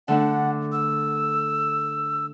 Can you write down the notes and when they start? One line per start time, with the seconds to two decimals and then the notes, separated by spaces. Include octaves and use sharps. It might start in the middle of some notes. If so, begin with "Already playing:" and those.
0.08 D3 A3 D4 F#5
0.72 E6